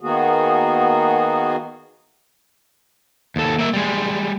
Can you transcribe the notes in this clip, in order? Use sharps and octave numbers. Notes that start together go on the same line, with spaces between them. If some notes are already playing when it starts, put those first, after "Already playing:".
D#3 A#3 B3 F#4 G#4
D#2 A4
A#3 E5
G3 G#3